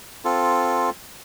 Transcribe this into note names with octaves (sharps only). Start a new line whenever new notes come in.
C4 F4 A4